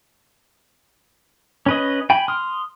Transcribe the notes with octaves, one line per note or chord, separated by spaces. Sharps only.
C#4 B4 D#5
G5 G#5 B5
C6 D#6 F6